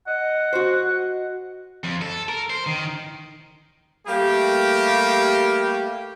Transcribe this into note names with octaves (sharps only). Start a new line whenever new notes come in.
D#5 F#5
F#4 C5
F2
A4
A#4
C5
D#3
G3 A3 A#3 G4